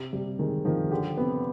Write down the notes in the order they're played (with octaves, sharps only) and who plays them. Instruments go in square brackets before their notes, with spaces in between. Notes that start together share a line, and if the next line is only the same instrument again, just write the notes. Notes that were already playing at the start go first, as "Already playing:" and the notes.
Already playing: [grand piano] C3
[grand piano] C3 [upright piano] G3
[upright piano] D#3 [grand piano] G#3
[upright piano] D#3 [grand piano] F3
[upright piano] D3 [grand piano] G4
[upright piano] C3 [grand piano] B3